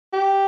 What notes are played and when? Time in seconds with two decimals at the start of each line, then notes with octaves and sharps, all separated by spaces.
0.13 G4